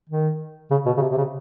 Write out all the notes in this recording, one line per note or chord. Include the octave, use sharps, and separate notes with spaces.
D#3
C#3
B2
C#3
C3
C3
C#3